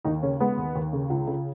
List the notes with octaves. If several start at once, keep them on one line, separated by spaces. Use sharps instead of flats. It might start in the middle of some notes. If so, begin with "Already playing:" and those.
D#2 D#4
C#3 C#4
G#3 B3
D#2
D#2
C#3
C#2
C#3